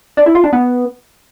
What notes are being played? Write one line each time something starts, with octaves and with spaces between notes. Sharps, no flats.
D4
E4
F4
D4
B3